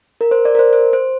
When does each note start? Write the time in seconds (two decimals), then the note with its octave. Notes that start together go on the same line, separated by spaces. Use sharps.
0.21 A#4
0.31 C5
0.45 D5
0.55 A#4
0.59 C5
0.73 C5
0.93 C5